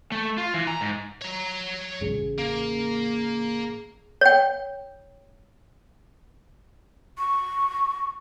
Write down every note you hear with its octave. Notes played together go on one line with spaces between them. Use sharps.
A3
F4
E3
A#5
G#2
C#5 A#5
A1 C#3 G#4
A#3
C#5 G5
C#6